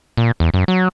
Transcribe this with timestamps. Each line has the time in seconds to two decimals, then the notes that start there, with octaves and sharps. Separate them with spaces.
0.17 A#2
0.40 E2
0.54 F#2
0.68 F#3